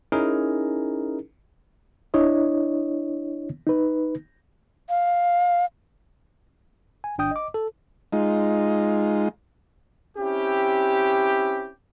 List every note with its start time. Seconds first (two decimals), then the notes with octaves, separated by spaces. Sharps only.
0.12 C#4 D#4 E4 G#4 A#4
2.14 D4 E4 C#5 D#5
3.67 D#4 B4
4.89 F5
7.04 G#5
7.18 G1 D4 G5 D#6 G6
7.31 D#5 D6
7.54 A4
8.13 G#3 D#4 F4
10.18 C4 C#4 E4 G4